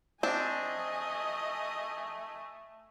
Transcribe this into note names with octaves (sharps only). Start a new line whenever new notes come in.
A3 C4 D4 D#5 G#5